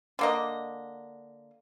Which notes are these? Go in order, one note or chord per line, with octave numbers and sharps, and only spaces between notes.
D3 A#3 D#5